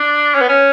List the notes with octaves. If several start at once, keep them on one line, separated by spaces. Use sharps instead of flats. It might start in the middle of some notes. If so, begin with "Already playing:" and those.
Already playing: D4
C#4
B3
C#4